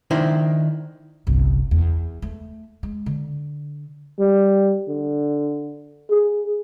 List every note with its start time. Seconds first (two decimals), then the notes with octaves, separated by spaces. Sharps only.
0.11 D#3 D4 E4 C5
1.27 G1 C2
1.71 E2
2.22 A3
2.83 G#3
3.06 D3
4.19 G3
4.88 D3
6.10 G#4